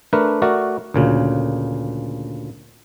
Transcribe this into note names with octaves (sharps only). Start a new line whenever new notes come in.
A3 D4 A#4 B4
A3 F#4 A#4 D5
D2 A#2 C#3